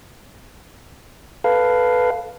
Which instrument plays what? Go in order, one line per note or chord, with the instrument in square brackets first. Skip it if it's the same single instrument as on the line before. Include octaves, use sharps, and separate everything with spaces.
[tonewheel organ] A4 B4 F5